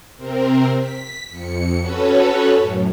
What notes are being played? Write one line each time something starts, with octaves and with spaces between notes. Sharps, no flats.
C3 C4 A#4
B6
F2 C#7
C#4 F#4 A4 B4 C#5
F#2 A2